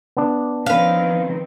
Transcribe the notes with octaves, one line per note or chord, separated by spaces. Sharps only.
B3 D4
D#3 F3 C4 C#4 B4 F5